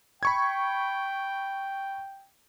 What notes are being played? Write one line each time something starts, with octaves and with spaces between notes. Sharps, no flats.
G5 B5 C#6 G#6